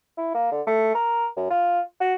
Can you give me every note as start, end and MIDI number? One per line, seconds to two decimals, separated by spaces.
0.18 0.32 64
0.35 0.50 58
0.52 0.61 50
0.67 0.92 57
0.94 1.27 70
1.36 1.49 42
1.50 1.80 65
2.01 2.15 66